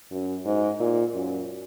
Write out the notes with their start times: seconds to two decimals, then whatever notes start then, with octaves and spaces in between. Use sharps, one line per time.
0.11 F#2
0.45 G#2
0.80 A#2
1.14 F#2